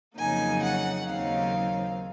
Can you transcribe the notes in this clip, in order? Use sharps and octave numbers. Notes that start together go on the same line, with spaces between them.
F2 C#3 F#3 A#3 D#4 G#5
F#5
D#2 C#3 F#3 C4 D#4 F5